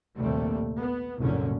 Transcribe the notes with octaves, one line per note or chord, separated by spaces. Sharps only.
A#1 D#2 C3 G3 A3
B3
F#1 C2 F#2 A#2 D3 C#4